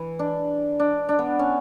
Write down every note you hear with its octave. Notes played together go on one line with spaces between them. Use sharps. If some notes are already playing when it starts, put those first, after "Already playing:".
Already playing: E3
D4
D4
D4
B3
C#4